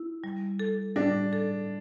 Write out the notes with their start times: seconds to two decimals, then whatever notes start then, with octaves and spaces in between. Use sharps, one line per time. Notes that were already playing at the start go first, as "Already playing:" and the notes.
Already playing: E4
0.24 G3
0.59 A4
0.96 G3 D4
1.33 A4